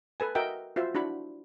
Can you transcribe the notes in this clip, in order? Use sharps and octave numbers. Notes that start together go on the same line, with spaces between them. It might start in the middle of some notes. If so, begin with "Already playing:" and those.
A4 B4 G#5
F#4 A#4 D#5 E5 F#5 G5
F4 F#4 C5 E5 F5
D4 E4 F#4 B5